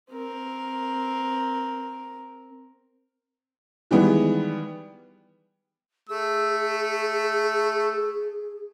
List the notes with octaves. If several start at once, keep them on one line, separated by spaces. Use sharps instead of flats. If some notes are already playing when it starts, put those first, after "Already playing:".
C4 A#4
D#3 E3 G3 G#3 B3
A3 G#4 E6